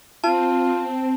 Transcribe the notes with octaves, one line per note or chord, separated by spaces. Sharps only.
C4 F4 A5